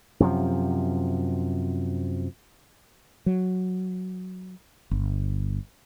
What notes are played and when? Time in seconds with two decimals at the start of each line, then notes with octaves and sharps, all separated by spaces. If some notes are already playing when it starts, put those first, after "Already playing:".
0.20 F#2 C3 F3
3.26 F#3
4.91 G1